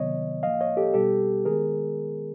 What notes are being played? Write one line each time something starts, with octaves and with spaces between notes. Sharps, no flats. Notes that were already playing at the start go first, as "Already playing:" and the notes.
Already playing: C3 D#3 F#3 B3 C#5 D#5
A2 F3 A#3 D#5 F5
C#5 D#5
G4 A4
B2 G3 B3 G4 A4
D#3 G#3 B3 G#4 A#4